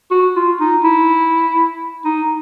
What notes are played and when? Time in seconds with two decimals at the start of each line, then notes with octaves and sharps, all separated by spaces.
0.11 F#4
0.36 F4
0.60 D#4
0.84 E4
2.05 D#4